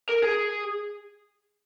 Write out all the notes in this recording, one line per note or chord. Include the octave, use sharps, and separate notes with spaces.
A#4
G#4